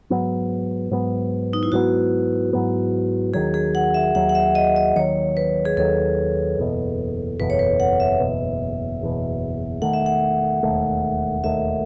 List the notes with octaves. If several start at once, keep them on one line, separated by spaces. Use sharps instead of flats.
G#2 F#3 B3
G#2 F#3 B3
D#4
E4
G#2 F#3 B3 F#4
G#2 F#3 B3
D#2 D#3 F#3 G#4
G#4
F#5
E5
D#2 D#3 F#3 F#5
F#5
E5
D#5
D#5
D#2 D#3 F#3 C#5
B4
G#4
D#2 D#3 F#3 A4
F#1 E2 B2
F#1 E2 B2 B4
C#5
B4
F#5
E5
F#1 E2 B2
F#1 E2 B2
E1 D#2 D#3 A3 F#5
E5
F#5
E1 D#2 D#3 A3
E1 D#2 D#3 A3 E5